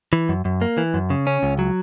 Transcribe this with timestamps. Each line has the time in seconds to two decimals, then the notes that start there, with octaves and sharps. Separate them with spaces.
0.13 E3
0.29 F#2
0.45 F#2
0.61 A#3
0.78 E3
0.94 F#2
1.10 C#3
1.27 C#4
1.43 C#2
1.59 F#3